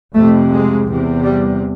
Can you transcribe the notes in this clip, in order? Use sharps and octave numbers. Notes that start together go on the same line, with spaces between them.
F2 C3 A3
G#3
E2 C3
G3